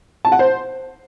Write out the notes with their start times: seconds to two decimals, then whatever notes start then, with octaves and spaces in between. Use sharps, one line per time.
0.25 A5
0.32 F#5
0.39 C5